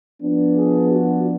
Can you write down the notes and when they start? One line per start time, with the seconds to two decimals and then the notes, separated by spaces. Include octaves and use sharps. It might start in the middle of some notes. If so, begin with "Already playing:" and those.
0.22 F3 B3 D4
0.56 G#4
0.89 F#4